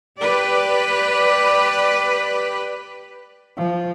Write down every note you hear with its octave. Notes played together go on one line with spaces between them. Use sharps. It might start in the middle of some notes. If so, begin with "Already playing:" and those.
G4 B4 D5
F3